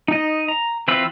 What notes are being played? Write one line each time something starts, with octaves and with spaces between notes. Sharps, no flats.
D#4 D#5
A#5
E3 C4 F4 B4 E6